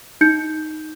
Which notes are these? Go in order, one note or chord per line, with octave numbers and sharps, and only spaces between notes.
D#4 G6 C#7